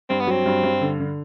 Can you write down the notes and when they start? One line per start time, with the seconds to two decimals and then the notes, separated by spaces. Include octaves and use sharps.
0.10 G2 C4
0.20 B3
0.27 F#3 C4
0.46 G2
0.63 G2
0.81 D3
1.00 D3